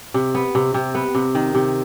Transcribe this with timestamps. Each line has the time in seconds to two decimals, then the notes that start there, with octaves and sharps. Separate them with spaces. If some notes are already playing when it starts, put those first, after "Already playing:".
0.14 C3
0.35 B3
0.55 C3
0.74 C3
0.95 B3
1.15 C3
1.35 D#3
1.55 C3